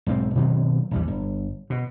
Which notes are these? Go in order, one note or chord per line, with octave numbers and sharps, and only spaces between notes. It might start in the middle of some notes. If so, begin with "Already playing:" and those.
B1 G#2 G3 C4
B2 D#3 F#3 C4
A#1 E2 G3
G1
B2